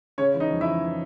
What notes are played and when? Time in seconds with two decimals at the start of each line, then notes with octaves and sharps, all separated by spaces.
0.18 C#3 C#4 C#5
0.34 E3
0.40 D#4 D#5
0.50 F2
0.61 E4 E5
0.68 E3
0.84 E3